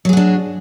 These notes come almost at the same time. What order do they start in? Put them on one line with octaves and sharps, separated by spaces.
F#3 G#4 F#4 D4